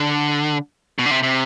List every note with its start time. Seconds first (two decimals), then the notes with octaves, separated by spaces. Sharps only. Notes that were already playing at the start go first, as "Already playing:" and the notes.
Already playing: D3
0.99 B2
1.06 D3
1.11 C3
1.23 C3